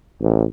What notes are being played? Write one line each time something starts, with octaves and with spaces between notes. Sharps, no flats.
A1